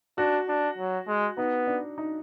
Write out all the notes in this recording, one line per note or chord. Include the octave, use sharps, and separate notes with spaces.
D4 F#4
D4
F#3
G#3
B3 D#4
D4
D#4